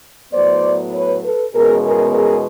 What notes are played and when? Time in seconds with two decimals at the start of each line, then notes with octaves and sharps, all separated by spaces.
0.32 A2 F#3 B3 C5 D5
0.93 B4 C#5
1.23 A4 B4
1.54 E2 B2 G#3 C#4 G#4 A#4
1.84 G#4 A#4
2.14 G#4 A#4